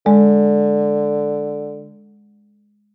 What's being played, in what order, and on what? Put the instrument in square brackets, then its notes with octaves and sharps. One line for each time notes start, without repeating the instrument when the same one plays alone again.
[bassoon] D3 [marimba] G#3